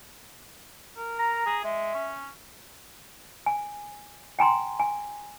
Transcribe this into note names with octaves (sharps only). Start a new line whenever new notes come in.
A#4
A#5
G#4
G#3 E5
C#4
G#5
G5 G#5 A#5 C6
G#5